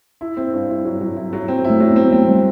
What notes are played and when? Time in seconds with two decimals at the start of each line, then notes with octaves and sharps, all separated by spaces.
0.21 E4
0.37 C4
0.53 G2
0.69 E4
0.85 F#3
1.01 F#3
1.17 E4
1.33 F#3
1.48 C4
1.64 E4
1.70 A3
1.80 F#3
1.91 B3 C4
2.12 A3 C4
2.29 G3